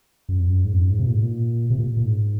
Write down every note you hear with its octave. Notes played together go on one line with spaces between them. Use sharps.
F#2
F2
F#2
G#2
F2
F#2
G#2
C3
A#2
G#2
A#2
C3
A#2
A#2
G#2